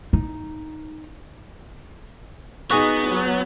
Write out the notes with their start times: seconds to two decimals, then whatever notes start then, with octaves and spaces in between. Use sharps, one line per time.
0.13 D#4
2.71 B3 D#4 F#4 G#4
3.08 F#3